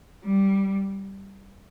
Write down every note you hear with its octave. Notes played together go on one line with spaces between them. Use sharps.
G3